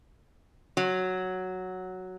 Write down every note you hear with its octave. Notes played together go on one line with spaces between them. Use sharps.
F#3